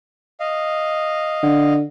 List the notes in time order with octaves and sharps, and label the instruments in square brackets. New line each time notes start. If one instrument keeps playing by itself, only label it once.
[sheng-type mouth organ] D#5 F5
[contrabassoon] D3